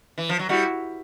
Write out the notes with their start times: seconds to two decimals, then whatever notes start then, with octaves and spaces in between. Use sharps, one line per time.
0.18 E3
0.29 F3
0.39 F#3
0.49 G3 E4 F#4